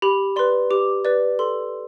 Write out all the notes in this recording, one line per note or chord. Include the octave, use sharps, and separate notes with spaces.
G4 B5
B4 D5 C6
G4 D6
B4 D5
A4 C6